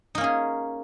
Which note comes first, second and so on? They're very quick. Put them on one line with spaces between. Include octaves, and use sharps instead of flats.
D#4 A#3 C#4 G#4